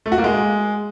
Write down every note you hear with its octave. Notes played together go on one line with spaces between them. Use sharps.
A3
F#4
A#3
G#3